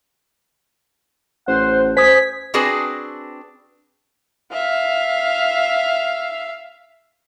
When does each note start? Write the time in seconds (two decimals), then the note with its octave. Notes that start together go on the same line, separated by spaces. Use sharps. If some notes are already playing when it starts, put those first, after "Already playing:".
1.48 A1 C5 F#5
1.97 C5 G#5 D#6 B6
2.54 C4 D4 F#4 G#4 B4
4.53 E5 F5